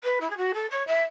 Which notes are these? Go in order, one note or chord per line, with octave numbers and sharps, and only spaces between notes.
B4
E4
G#4
F#4
A4
C#5
E5